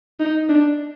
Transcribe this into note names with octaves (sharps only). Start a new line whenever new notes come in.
D#4
D4